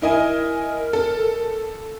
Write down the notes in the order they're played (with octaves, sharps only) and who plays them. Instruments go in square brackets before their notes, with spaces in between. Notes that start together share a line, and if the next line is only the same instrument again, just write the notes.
[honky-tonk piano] E4 D#5 G#5 [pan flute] A#4
[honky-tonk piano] A4